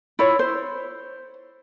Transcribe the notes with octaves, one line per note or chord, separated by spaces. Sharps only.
E4 F4 C#5
C5